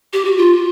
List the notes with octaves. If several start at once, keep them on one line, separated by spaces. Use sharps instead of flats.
G4
F#4
F4